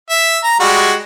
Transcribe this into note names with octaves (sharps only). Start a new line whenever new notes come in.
E5
A#5
G3 G#3 F#4